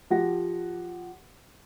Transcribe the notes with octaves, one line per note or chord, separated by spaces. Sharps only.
F3 G4 F#5 A#6